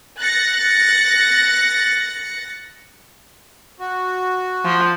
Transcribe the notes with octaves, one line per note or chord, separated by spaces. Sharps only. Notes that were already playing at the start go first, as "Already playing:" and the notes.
F#6 A6 A#6 C#7
F#4
F3